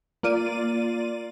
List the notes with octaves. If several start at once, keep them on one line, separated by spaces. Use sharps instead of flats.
A#3 F4 D5 D#7